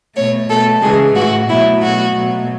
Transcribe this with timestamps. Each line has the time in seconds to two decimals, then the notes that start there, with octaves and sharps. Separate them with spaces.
0.16 B2 A3 C#5
0.49 B2 A3 A4
0.82 C#3 E3 G#3 G#4
1.15 A2 G#3 F#4
1.49 B2 F#3 A3 E4
1.82 B2 A3 F#4
2.16 B2 F#3 A3